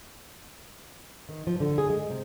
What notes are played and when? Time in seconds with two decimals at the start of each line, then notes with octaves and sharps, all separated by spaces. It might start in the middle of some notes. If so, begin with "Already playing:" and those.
1.29 D#3
1.47 F3
1.60 D3
1.78 G#4
1.90 G#3
2.10 C3